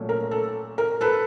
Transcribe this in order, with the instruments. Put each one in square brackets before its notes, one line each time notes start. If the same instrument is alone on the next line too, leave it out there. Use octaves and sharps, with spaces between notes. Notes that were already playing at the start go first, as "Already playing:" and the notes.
Already playing: [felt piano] A#2 F#3 A3 C#4
A#4
A4
A#4
A4 B4